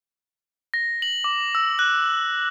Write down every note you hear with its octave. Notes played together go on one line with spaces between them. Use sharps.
A#6
F#7
D6
E6
F#6